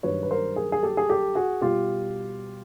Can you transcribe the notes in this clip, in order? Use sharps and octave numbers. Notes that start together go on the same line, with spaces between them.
G2 D#3 F#3 B4 C#5
B4
A#4 C5
G#4 A#4
G#4
G4 A4
G#4
G4 A4
F#4 G#4
B2 G3 F4 G4